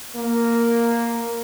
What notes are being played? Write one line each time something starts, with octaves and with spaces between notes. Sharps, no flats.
A#3